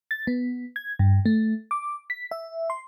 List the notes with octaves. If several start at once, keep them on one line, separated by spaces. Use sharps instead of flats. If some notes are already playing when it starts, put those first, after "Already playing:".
A6
B3
G#6
G2
A3
D6
B6
E5
C6